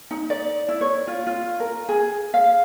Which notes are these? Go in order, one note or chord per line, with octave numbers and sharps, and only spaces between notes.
D#4
D5
E4
C#5
F4
F4
A#4
G#4
F5